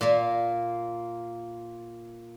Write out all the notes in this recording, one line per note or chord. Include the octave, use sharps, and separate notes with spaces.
A#2 A#3